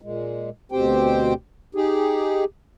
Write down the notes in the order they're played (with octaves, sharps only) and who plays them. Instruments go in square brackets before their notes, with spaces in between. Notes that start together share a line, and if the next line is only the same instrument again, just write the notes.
[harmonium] A#2 G#3
D2 B2 C4 G4 C5 G5
D#4 G4 G#4